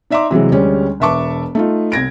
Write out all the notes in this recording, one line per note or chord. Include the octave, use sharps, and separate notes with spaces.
D#4 D5 E5 A#5 C6 D6
C3 E3 F#3 G#3
D2 G3 G#3 C#4
E1 B4 E5 A5 C#6 D6
A3 D#4 F4
C2 G#6 A#6 D7